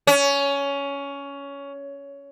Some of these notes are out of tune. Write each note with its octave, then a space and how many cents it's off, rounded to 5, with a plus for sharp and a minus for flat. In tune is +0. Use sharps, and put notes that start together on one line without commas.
C#4 +15